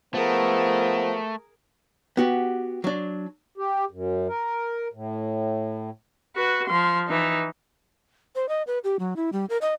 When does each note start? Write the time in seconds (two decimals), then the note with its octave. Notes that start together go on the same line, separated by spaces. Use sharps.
0.15 F3 A3 B3 G#4 A#4
2.17 B3 F#4 G4
2.84 F#3 D4
3.58 G4
3.91 F#2
4.28 A#4
4.93 A2
6.36 F#4 B4
6.68 F3 C6
7.09 E3 D#4
8.36 C5
8.49 D#5
8.67 B4
8.84 G4
8.99 F#3
9.16 E4
9.33 G3
9.50 A#4
9.61 D#5